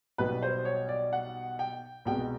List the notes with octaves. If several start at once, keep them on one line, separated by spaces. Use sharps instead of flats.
B1 B2 G3 B4
C5
C#5
D5
F#5
G5
C2 B2 G#3 B3 G5